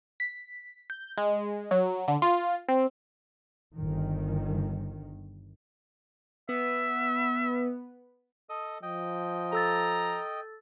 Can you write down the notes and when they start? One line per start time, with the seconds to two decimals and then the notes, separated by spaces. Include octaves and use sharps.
0.20 B6
0.90 G6
1.17 G#3
1.71 F#3
2.08 D3
2.22 F4
2.68 C4
3.76 G1 D#3
6.49 B3 E5
8.49 A4 D#5 D#6
8.83 F3 D#5 G5
9.53 A4 A#5 E6 A6